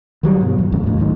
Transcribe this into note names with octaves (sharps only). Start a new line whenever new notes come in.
D#3 F#3 G3
G2 B2
F2
A1 F2 C#3
D2 A2
F#2 A2 D#3